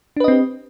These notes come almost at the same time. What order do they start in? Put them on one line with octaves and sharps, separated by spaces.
D4 B4 D#5 C4 G4